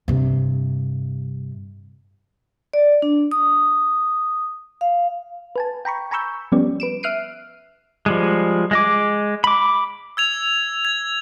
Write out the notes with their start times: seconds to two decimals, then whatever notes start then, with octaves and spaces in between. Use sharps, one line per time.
0.08 G2 C3
2.73 D5
3.02 D4
3.31 D#6
4.81 F5
5.56 B4 G#5 A5
5.85 G5 A#5 B5 C#6
6.11 G#5 A#5 B5 C#6 E6 G6
6.52 F3 G3 B3 C#4 G4 D5
6.80 B4 D7 E7
7.03 E5 F6 F#6 C7 D7 D#7
8.06 F3 G3 G#3
8.71 G#3 D#5 D6
9.44 B5 D6
10.17 E6 G#6 F7
10.85 G#6